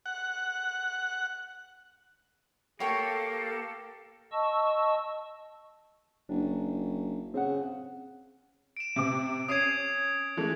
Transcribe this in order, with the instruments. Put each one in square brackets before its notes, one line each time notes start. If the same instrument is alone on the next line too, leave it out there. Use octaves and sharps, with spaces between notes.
[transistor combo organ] F#5
[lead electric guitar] A#3 [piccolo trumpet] G4 [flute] A4 [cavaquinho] C#5 G5 C#6
[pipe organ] D#5 A5 C#6 E6
[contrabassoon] F#1 [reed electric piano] D4
[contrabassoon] C#3 [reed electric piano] C4 F#5
[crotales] D7 E7
[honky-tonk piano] C3 C4 D6
[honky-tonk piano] C#4 C7 D#7 [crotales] D#6 G#6
[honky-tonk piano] E3 G#3 A3